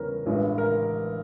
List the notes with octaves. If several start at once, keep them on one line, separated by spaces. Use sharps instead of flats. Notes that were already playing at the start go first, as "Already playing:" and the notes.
Already playing: E2 C#3 E3 G3 A#4 B4 C#5
A1 G2 E3 G#3
A#4